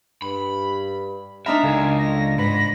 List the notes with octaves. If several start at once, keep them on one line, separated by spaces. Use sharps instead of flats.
G2 B5
D4 D#4 E5 A#5 B5 F6
C#2 F#2 A4 F5 G#5
A#6
G#2 B5 A#6